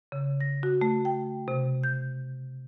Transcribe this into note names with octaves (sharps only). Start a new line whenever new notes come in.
C#3
A#6
F#4
A3
G5
C3
G6